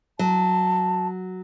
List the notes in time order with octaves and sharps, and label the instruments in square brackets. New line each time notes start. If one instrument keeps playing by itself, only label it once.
[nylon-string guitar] F#3 [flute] A5